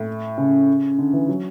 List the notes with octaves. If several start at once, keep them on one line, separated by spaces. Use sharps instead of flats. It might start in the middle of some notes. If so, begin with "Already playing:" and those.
Already playing: A2
C#3
D3
E3
F#3